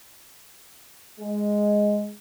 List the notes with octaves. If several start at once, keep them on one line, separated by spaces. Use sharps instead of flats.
G#3